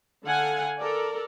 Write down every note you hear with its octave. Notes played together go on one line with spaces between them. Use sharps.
D3 A4 F5 F#5 G#5
A4 A#4 D5